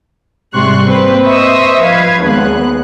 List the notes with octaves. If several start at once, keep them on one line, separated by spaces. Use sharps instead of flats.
G#2 C3 G3 C6 C#6 F#6
A#3 C4 B4 C5
B4 C5 D#5 E5 C#6 D#6
F3 B4 F5 G#6
G#1 D#2 G#3 B3 F#6